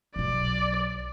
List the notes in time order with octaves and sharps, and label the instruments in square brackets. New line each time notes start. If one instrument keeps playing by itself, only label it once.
[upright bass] B1 F#3 [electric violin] D5